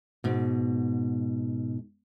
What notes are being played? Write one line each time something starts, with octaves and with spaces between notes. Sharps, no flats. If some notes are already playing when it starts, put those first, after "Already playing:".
G#2 B2